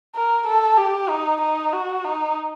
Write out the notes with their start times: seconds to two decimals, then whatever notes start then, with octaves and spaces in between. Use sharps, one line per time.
0.15 A#4
0.47 A4
0.77 G4
1.09 D#4
1.41 D#4
1.73 F#4
2.05 D#4